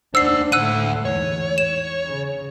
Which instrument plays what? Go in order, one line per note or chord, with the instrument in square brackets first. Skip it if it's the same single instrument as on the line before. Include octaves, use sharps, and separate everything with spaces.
[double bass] D#2 D4 [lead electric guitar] C5 F#5 [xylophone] E6 C7
[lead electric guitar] D2 F#5 [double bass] A2 A3 [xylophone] E6 F#6 D#7
[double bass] E2 G#2 [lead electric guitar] C#5
[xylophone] E7
[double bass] C#3